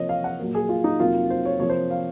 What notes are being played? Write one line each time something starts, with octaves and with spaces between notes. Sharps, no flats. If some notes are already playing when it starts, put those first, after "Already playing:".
Already playing: C3 F3 A#3 C#5 D#5
F5
F#5
A#2 F#3 A#3
G#4
F4
D#4
F2 C3 F#3 A#3 F4
C5
C#5
C3 F3 A#3 C#5
C5
F5